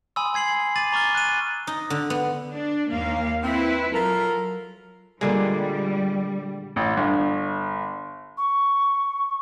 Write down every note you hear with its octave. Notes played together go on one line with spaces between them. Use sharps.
G#5 B5 C6 D#6 E6
G#5 G#6 C7 F#7
C7
D6 A6 D#7 F#7
A#5 C#6 D6 F6 G7
F#6 D#7
D#4
D3
B3
D4
D#2 A#3 F5
C4 E4 B4
F#3 F4 A4 A#4
A#2 D3 G3 G#3
A1
G1
C#6